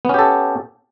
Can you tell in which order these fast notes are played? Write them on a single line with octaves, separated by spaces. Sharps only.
B3 C#4 G4 A4